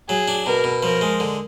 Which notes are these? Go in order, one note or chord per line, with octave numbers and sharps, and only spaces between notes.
F#3 G#4
D4
B2 A#4
B2
F3 A#4
G#3
D3